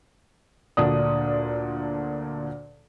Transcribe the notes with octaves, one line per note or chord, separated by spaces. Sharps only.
D2 A#2 D3 D4 D#6